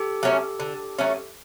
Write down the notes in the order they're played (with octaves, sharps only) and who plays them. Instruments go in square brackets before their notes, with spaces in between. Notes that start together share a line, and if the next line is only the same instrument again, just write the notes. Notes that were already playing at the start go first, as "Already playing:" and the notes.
Already playing: [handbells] G4 A4
[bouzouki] F#3 A3 C#4
D3
F#3 A3 C#4